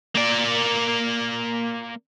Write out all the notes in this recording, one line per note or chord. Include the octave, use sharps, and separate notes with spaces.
A#3 D5